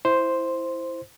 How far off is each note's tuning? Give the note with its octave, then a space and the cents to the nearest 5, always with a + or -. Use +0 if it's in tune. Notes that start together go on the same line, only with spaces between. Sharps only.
E4 +0 C5 +0